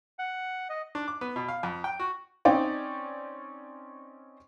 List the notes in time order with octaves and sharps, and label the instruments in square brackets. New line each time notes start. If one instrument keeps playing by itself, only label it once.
[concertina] F#5
D#5
[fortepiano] D4
D6
B3
B2
F5
F2
G5
F#4
[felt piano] C4 C#4 D#4 D5 G5